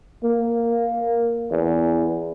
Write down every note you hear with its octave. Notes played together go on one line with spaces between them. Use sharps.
A#3
E2